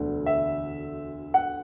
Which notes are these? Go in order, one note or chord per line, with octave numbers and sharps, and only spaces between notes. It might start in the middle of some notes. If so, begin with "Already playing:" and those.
Already playing: E1 D2 D3 A3
E5
F#5